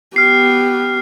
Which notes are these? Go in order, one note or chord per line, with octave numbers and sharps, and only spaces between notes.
B3 G4 F6 C7